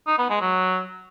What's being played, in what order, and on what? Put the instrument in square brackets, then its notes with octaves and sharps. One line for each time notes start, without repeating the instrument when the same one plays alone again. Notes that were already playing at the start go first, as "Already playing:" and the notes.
[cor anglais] D#4
B3
G#3
F#3